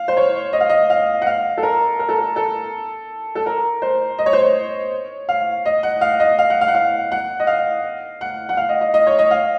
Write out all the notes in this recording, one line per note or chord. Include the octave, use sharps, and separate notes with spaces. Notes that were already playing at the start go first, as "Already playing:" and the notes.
Already playing: F5
C5
C#5
D#5
F5
D#5
F5
F#5
F5
A4
A#4
A#4
A4
A#4
A4
A4
A#4
C5
D#5
C#5
C5
C#5
F5
D#5
F#5
F5
D#5
F5
F#5
F5
F#5
F5
F#5
D#5
F5
F#5
F#5
F5
D#5
D#5
D#5
C#5
D#5
F5